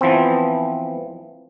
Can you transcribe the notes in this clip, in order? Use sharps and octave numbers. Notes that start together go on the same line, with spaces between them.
E3 F3 B3 C4